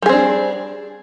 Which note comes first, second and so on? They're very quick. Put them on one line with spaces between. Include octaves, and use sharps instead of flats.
G3 G#4 C4 D4